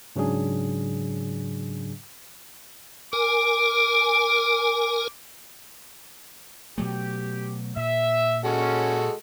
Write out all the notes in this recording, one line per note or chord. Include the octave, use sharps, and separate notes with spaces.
G#2 C#3 F#3 D4 G#4
A#4 G#5 D6
B2 F#3 A3 G4
A#2 E5
G#3 C#4 F#4 A4